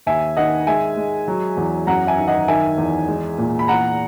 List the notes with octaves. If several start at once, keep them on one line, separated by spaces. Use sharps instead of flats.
D#2 E5 G#5
D#3 D#5 F#5
G#3 E5 G#5
G#3
F#3
E2
F#2 F#5 A#5
E5 G#5
D#3
D#5 F#5
D#3 E5 G#5
E2
G#3
A#2
B5
E2 F#5 A#5